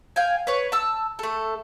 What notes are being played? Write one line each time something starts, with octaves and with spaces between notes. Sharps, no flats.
F5 G5 G#5
B4 C#5
A5 E6
A3 A4